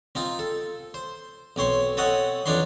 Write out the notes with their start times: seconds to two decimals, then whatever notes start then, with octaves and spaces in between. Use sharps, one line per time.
0.15 C4 D#4 F4
0.39 A4
0.94 C5
1.56 B1 C4 C#5 C6
1.97 C4 A4 C#5 D#5 F#5
2.46 F2 E3 D4 D#4 C#5 C6